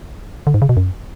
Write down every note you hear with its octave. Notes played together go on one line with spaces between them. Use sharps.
D3
G#2
C#3
B2
F#2